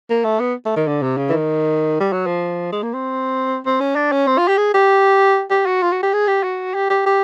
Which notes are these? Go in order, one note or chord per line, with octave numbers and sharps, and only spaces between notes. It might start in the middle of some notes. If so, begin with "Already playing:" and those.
A#3
A3
B3
A3
D#3
D3
C3
C#3
E3
D#3
G3
F#3
F3
G#3
A#3
C4
C4
C#4
D4
C#4
C4
F4
G4
G#4
G4
G4
F#4
F4
F#4
G4
G#4
G4
F#4
G4
G4
G4